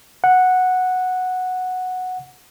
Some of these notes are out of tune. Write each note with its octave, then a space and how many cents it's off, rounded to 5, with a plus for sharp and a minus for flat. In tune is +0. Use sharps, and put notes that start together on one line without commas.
F#5 -5